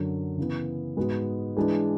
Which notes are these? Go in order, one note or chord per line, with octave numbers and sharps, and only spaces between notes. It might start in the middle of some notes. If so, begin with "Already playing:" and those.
Already playing: F#2 D3 F#3
C#3 E3 B3
G#2 G#3 B3 F#4 B4
E3 G#3 D4 G#4 B4